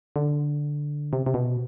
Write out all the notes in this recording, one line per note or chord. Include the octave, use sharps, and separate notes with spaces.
D3
C3
C3
B2